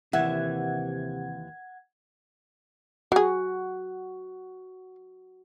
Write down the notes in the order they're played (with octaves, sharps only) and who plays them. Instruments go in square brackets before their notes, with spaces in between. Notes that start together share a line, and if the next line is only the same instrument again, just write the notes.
[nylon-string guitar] D#2 E5 [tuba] C3 [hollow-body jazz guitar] E3 [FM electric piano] F#5 G#6
[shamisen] F#3 G#4 [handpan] F#4